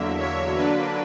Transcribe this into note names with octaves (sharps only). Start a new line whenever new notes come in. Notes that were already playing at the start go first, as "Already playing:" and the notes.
Already playing: E2 D3 F#3 A#3 E5
C#5
D3 F#3 A#3 D4 B4